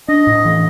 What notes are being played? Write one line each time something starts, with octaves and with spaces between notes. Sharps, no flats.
D4 D#5
A2
E3